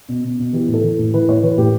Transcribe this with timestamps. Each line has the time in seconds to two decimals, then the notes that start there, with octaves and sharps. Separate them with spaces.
0.09 B2
0.24 B2
0.39 B2
0.53 E3 G4
0.68 A2
0.74 A4
0.83 E3
0.99 A2
1.14 E3 B4
1.28 A2 C#5
1.43 E3 B4
1.58 A2 G4